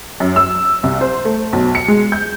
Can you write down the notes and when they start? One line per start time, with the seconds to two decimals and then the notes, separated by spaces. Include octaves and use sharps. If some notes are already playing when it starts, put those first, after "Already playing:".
0.20 F#2
0.36 E6
0.83 C2
1.01 C5
1.25 A3
1.53 B1
1.75 C#7
1.88 G#3
2.12 G6